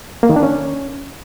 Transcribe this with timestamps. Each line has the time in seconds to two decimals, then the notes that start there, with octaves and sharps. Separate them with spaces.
0.23 A#3
0.30 D#3
0.36 D4
0.43 C#4